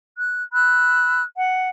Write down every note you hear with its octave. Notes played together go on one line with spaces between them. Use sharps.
F#6
B5 E6 F#6
F#5